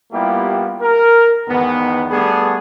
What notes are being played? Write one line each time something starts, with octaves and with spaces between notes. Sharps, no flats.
G3 A#3 B3 E4 F4 G4
A#4
E2 G#2 D#3 B3
G3 A3 B3 D4 G#4